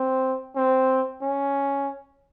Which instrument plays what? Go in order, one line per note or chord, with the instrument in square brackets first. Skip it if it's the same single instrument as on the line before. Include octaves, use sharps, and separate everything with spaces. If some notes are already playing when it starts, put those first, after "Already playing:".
Already playing: [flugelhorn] C4
C4
C#4